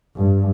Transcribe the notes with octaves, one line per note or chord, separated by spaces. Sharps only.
G2